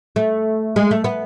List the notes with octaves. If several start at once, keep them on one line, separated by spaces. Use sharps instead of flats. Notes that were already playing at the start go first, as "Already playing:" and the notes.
A3
G#3
A3
B3